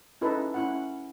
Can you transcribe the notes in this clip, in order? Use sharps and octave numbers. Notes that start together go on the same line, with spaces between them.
C#4 D#4 E4 A4 B4
C#4 E4 F#5